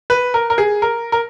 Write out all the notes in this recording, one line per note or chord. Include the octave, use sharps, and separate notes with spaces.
B4
A#4
A#4
G#4
A#4
A#4